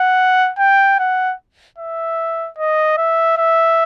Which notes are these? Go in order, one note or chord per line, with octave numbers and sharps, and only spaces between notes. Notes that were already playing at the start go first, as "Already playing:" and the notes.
Already playing: F#5
G5
F#5
E5
D#5
E5
E5